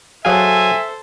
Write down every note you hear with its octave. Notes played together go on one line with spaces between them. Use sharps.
F#3 G#4 A4 C5 E5 F5 G#5